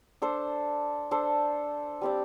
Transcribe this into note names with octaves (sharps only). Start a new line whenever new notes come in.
D4 A4 C5
D4 A4 C5
G3 C4 G4 D5